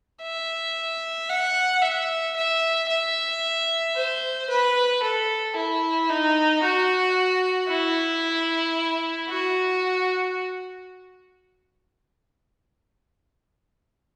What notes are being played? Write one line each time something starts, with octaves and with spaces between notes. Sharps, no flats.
E5
F#5
E5
E5
E5
C5
B4
A4
E4
D#4
F#4
E4
F#4